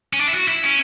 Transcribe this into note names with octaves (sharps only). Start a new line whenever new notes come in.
C#4
D4
E4
F#4
E4
C#4